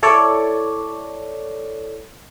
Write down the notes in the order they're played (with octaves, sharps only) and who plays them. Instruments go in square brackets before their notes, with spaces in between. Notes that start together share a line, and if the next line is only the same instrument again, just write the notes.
[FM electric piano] E4 A4 C#5 D5